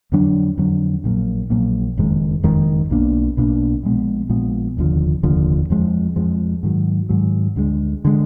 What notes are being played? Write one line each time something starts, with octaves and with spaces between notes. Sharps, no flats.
F2 D3 F#3 D4
F2 D3 F#3 D4
A#1 A#2 F#3 A#3
A#1 A#2 F#3 A#3
F#1 F2 D#3 G#3
F#1 F2 D#3 G#3
B1 B2 A#3 D4
B1 B2 A#3 D4
A#1 A#2 G#3 B3
A#1 A#2 G#3 B3
F1 D#2 D3 F3
F1 D#2 D3 F3
F2 F3 G#3
F2 F3 G#3
G#2 D#3 F#3
G#2 D#3 F#3
D2 D3 G#3
D3 G#3